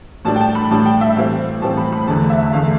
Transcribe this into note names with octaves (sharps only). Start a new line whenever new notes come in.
A2 G3 D4 A5
G5
A5
B5
A2 G3 D4 A5
G5
E5
A2 E3 G3 C4 F5
A2 E3 G3 C4 A5
B5
B5
E2 D3 A3 A5
E5
E2 D3 A3 F5